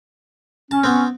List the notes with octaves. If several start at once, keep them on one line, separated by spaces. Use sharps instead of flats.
C#4 A5
B3 C4